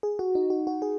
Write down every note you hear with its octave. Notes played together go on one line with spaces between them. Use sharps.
G#4
F#4
D#4
F#4
F#4
G#4